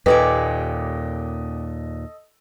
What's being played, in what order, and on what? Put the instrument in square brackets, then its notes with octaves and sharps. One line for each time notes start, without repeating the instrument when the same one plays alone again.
[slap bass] D#2 A#2 [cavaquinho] G4 D5 G#5 [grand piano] A4 D#5 [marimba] B4